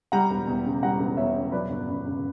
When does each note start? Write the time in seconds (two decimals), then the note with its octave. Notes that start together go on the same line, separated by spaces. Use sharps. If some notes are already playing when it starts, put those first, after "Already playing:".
0.12 G3 F#5 A#5
0.30 E1
0.47 E2
0.65 C#3
0.83 G3 F#5 A#5
0.99 E1
1.17 E2 C#5 E5
1.35 C#3
1.52 F#3 B4 D5
1.70 G1
1.88 F#2
2.06 C#3